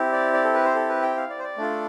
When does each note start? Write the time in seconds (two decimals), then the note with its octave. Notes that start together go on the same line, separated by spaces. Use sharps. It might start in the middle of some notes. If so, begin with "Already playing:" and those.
Already playing: C4 E4 G4
0.12 D5
0.33 D5
0.44 A4
0.54 B4
0.65 C5
0.75 A4
0.89 B4
1.02 G5
1.17 F5
1.30 D5
1.39 C5
1.44 D5
1.57 A3 D4 F4 A4